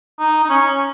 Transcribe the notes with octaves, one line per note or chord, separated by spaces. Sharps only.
D#4
D#4
C#4